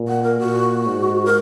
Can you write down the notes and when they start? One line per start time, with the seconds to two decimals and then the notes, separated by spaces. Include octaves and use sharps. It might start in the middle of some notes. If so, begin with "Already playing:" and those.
Already playing: A#2
0.08 F#5
0.23 A#4
0.39 A#2 F#4
0.87 G#2
1.26 A#4